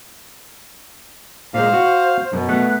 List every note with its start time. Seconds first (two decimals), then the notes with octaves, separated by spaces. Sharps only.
1.54 A#2 G#3 C5 F5
1.73 F#4
2.33 F#2 B2
2.49 A3 B3 F#6